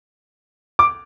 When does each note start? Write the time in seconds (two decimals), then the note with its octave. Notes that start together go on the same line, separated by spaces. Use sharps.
0.79 D6